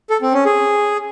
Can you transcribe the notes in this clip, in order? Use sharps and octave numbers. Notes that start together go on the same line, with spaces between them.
A4
C4
C#4
G#4